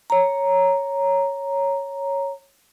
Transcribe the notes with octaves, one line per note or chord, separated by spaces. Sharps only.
C#5 A#5